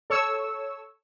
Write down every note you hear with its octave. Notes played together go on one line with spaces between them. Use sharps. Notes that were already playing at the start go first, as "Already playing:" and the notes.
A4 C#5 C#6 E6